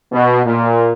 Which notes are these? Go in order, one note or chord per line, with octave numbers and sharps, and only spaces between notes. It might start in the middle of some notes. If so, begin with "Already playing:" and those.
B2
A#2